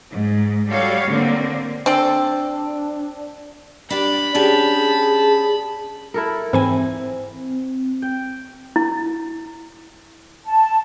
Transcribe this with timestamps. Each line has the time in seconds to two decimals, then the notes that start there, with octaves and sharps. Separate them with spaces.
0.11 G#2
0.69 G3 F#4 A4 C#5 F5
1.08 D3 A#3 C4
1.86 C4 D4 A4
3.90 D4 G4 D5 B5
4.35 C#4 D4 G4 G#4 A5
6.14 E4 A4 A#4
6.53 G#2 E3 C4 E4 G#5
8.02 G5
8.76 E4
10.46 A5